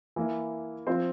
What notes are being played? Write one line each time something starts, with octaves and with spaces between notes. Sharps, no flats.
E3 A#3 E4
F3 C4 F4 C5